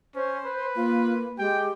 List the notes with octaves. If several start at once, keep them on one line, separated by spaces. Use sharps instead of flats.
C#4 C5
B4
A#3 F4
G#3 G4 G5